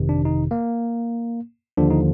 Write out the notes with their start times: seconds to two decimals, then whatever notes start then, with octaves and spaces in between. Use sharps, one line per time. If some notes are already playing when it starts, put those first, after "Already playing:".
Already playing: G1 F2 C3 D#3
0.09 D4
0.25 D#4
0.51 A#3
1.77 D#2 D3 F3 D4
1.91 D#4